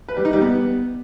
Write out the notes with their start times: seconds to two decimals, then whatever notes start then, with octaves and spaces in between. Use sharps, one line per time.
0.08 B4
0.17 G3
0.25 D#4
0.33 G3
0.41 B3